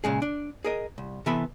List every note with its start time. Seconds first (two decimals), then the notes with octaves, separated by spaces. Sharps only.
0.04 A#2 C#3 G#3 G#4
0.22 D4
0.65 G#4 A#4 D#5
0.98 C2
1.26 C3 E3 B3 A4 E5 B5